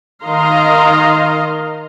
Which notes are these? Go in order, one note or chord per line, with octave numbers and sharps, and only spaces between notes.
D#3 A#4 D#5 F5 A#5 C6